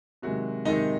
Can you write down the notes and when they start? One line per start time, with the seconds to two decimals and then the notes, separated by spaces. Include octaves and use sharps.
0.22 C3 D#3 F#3 G#3 F#4
0.65 C3 D#3 G#3 D#4 D#5